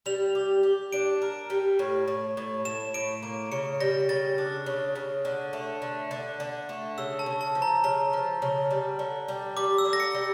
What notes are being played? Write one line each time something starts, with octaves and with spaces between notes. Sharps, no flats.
G3 F7
G4
G4
D4 D7
A#4
G3
A2
A2
A2
A2 E7
A2 D7
A#3
C#3 C#7
G3 A#6
C#3 A6
D4
C#3
C#3
D3
A3
D3
D3
D3
A3
C#3 E6
A5
C#3
A5
F3
A#5
C#3 A#5
F3
C#3
G3
D3
G3
G3 D6
E6
D3
A#6
C#7
G3